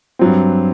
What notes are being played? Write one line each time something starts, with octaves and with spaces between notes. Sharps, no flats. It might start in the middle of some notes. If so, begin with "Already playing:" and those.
G2 F#3 C4